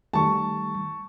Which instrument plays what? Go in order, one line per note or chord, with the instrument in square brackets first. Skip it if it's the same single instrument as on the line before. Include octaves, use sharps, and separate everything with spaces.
[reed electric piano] D#3 G3 A3 [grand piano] A5 C#6